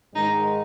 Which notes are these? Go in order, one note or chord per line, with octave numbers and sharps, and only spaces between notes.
G#2 D#3 G#3 D#4